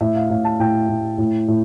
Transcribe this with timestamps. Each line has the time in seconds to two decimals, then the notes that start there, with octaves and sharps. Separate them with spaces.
0.01 A2 E5
0.15 F5
0.30 A2 F5
0.44 A5
0.60 A2 G5
0.89 A2
1.18 A2
1.48 A2